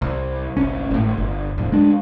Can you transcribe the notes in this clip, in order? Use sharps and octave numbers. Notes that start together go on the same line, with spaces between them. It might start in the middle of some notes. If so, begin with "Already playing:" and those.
C2
G1 C2 C#4
G#1 A2
G1
D1 F2
G#3 D4